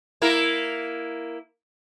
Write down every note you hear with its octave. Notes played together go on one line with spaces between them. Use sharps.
A#3 E4 A#4